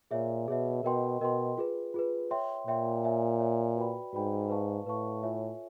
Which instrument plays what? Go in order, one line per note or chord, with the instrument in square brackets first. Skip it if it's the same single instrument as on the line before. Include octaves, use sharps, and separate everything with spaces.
[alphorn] A#2 [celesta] G#4 C#5 E5
[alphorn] B2 [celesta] G#4 C#5 E5
[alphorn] B2 [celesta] A#4 D#5 G5 C6
[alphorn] B2 [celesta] A#4 D#5 G5 C6
[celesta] F4 G#4 B4
F4 G#4 B4
C#5 E5 G5 C6
[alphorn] A#2 [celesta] C#5 E5 G5 C6
[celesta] C#5 E5 G#5
C#5 E5 G#5
F#4 B4 D5 G5 B5
[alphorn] G#2 [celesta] F#4 B4 D5 G5 B5
[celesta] B4 D5 F5 A5 C#6
[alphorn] A2 [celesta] B4 D5 F5 A5 C#6
[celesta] F4 A4 C#5 E5 G#5